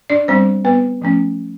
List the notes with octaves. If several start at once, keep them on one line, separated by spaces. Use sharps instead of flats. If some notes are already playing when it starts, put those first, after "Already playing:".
D4 D5
G3 B3 C4 D4 C5
B3 B4
F3 A3 C#4